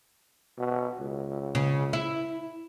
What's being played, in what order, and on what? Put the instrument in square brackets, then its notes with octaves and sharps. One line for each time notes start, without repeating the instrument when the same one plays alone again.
[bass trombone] B2
C#2
[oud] C#3
E4